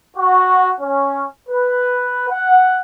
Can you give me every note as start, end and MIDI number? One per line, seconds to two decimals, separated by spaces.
0.17 0.70 66
0.80 1.25 61
1.49 2.29 71
2.30 2.81 78